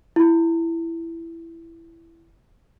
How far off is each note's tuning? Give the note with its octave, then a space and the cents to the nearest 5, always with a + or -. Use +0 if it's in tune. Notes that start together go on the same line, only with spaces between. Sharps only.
E4 +10